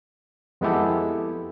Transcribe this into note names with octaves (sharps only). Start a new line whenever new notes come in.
F2 G#3 B3 E4 G4 A4